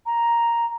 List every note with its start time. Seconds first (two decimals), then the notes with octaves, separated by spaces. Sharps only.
0.06 A#5